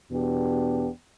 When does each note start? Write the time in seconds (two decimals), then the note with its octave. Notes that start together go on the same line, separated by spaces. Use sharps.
0.11 E2 B2 B3 D4 G4